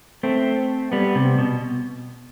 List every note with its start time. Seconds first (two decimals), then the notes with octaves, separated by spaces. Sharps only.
0.23 A3 C4
0.92 G3 B3
1.15 C3
1.38 B2